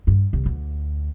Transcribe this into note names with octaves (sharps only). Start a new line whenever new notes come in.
G2
C2
D2